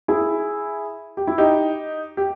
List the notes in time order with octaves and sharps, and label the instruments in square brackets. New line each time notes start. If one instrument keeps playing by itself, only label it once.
[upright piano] E4 G#4
G4
E4
D#4 G4
G4